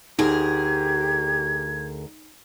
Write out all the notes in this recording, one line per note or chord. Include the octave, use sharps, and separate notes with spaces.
D2 D#4 G4 G#4 A#4 G#6